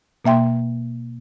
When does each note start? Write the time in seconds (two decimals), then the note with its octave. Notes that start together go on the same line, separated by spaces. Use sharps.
0.24 B2 A#3 E5 G5 C6